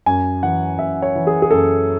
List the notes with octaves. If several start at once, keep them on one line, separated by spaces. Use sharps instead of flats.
F#2 G#5
E3 F#5
F#2 E5
C#5
E3
G#4
G#4
F#2 A4